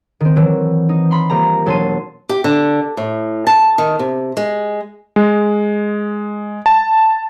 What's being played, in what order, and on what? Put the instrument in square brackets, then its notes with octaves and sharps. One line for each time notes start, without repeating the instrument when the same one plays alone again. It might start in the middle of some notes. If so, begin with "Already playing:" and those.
[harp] D#3 C4
E3 F#3
D#4
B5 C6
F3 G3 A#3 A#5
E1 F#3 A5 C6 C7 D#7
[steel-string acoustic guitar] G4
D3
A2
A5
D#3
C3
G#3
[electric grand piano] G#3
A5